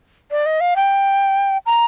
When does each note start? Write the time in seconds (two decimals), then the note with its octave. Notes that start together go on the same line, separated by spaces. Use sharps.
0.31 D5
0.46 D#5
0.61 F5
0.76 G5
1.66 A#5